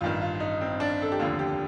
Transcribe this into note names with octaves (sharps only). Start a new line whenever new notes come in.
A1 G2 D#3 F4
F4
D#4
C4
D4
A4
G4
F1 D#2 D3 F4
G4